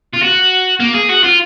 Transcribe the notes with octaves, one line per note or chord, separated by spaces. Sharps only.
F4
F#4
A#3
G#4
F#4
F4